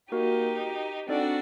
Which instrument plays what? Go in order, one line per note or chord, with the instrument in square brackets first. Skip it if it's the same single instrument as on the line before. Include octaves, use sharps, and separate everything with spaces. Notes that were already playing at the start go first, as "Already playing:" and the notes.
[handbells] A#3 F#4 A#4 [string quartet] D#4 G4
[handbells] C4 D#4 A4 D5 [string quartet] D4 F#4